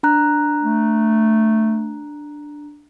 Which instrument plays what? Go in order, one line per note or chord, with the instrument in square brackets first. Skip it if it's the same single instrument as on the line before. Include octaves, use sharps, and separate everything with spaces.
[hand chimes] D4 A#5 F#6
[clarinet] A3